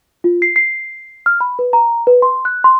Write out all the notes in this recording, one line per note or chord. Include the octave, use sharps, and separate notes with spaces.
F4
C7
C7
F6
B5
B4
A#5
B4
C6
F#6
C6